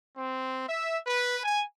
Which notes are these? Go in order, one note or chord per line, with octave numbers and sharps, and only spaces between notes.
C4
E5
B4
G#5